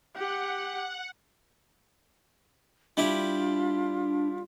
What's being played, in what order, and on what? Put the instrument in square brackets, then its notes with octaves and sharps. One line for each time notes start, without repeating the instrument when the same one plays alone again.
[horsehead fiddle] G4 [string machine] F#5
[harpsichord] G3 E4 G4 [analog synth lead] D4 [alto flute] F4